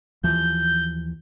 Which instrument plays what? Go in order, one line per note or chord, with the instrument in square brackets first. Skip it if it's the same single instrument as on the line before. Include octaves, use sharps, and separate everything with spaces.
[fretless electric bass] D#2 E3 F3 [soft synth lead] G6